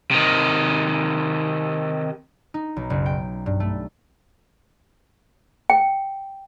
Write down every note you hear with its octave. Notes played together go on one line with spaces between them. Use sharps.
C3 D#3
D#4
B1
F#1
G5
G2
A3
G5